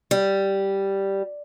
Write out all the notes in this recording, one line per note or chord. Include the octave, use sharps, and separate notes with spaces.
G3